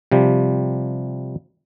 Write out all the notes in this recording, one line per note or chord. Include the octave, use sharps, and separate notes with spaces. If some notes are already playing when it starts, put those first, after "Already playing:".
C3 F3 G3